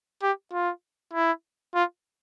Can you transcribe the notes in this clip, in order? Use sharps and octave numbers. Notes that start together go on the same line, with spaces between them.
G4
F4
E4
F4